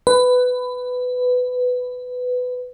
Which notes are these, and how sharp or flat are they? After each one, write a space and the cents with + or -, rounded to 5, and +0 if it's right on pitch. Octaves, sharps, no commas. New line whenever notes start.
B4 +15